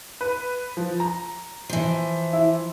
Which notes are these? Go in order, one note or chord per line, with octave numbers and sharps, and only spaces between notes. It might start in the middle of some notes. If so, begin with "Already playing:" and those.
B4
F3
A#5
E3 F3
E4